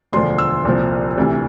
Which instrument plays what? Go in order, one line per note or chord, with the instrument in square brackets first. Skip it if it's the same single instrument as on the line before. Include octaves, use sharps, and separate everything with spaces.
[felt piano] E1 D2 D3 F3 C6
E6
C2 A#2 F3
D2 C3 E3